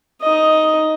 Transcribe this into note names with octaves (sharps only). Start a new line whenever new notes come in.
D#4 D#5